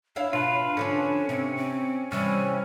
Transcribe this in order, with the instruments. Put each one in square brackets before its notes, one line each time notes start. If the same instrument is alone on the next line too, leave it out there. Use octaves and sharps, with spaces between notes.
[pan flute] D4 [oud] E4 C#5 F5
[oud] B2 [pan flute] D4 [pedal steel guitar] F4 B4
[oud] D3 F3 B4 [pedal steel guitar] C#4
[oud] C3 [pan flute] C4
[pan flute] C4
[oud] C3 E3 [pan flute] G3 [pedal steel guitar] C#4